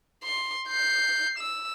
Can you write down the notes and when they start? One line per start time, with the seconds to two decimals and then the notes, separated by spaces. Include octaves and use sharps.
0.24 C6
0.69 G6 C7
1.38 E6